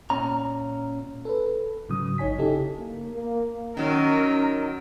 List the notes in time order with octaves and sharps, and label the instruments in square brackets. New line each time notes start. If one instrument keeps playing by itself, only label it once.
[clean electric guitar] A#2 C#4 A#5
[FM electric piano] A4 B4
G#2 C#3 F#3 D#6
A1 D#4 C#5 G#5 B6
C#3 D#4 E4 G4 A4
[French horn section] A#3
A#3
[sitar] D#3 F#3 [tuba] C#4 [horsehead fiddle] A#4